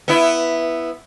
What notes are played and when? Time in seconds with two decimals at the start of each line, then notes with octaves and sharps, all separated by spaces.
0.08 B3 E4